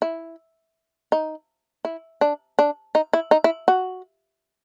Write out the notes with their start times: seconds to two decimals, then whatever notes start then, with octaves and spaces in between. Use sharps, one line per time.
0.02 E4
1.12 D#4
1.85 E4
2.21 D4
2.59 D4
2.95 D#4
3.13 E4
3.31 D#4
3.44 E4
3.68 F#4